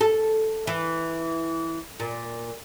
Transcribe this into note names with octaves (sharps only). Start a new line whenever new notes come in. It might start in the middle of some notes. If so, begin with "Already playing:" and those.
A4
E3
A#2